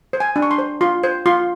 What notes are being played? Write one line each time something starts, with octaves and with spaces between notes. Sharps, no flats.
C5
G#5
D4
C#6
C6
C5
F4 C6
C5
F4 C6